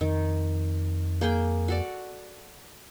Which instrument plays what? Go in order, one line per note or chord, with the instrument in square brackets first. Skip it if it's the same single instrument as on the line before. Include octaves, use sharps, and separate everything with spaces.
[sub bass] F2 [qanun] D#3
[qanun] A#3 G#4 G5
F#4 A4 D5